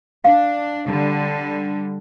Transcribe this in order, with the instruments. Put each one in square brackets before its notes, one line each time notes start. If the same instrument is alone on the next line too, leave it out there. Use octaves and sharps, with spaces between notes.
[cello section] D4 [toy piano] F5
[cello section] D3 G3